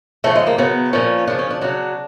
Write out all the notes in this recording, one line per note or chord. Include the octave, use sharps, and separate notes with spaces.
C#3 F3 A3
G#3
A#3
C#3 F#3 B3
A#2 F3 C#4
C#3 F3 D4
C#4
D4
C#3 F#3 D4